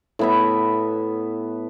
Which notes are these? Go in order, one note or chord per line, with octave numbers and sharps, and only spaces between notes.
A2 B3 E5